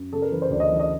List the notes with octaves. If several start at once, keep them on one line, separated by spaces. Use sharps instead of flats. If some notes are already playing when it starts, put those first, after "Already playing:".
Already playing: F#2
C#3 A4
A#4
E3 B4
C5
D2 D5
D#5
E3
D#5